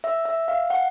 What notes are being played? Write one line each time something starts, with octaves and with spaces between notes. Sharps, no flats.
E5
E5
F5
F#5